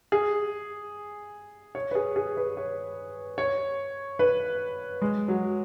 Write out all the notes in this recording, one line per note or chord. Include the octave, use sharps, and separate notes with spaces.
G#4
C#5
B4
G#4
G#4
B4
C#5
C#5
B4
G#3
F#3